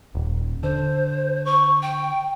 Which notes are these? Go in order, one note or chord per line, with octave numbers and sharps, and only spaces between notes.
D#1
D3 C5
C#6
G5